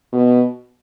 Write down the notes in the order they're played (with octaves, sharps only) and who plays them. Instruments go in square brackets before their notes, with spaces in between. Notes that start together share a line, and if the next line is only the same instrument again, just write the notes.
[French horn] B2